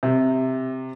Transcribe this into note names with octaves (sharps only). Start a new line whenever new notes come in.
C3